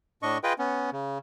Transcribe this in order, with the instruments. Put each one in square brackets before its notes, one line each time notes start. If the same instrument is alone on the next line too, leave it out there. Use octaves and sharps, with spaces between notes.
[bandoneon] A2 D4 D#5 C#6
F4 G#4 B4 D#5 G5
B3 C#4
C#3